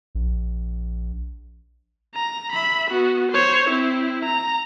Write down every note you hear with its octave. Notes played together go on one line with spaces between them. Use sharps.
A#1
A#5
E5 B5
B3 F#4
C5 C#5
C4 E4
A#5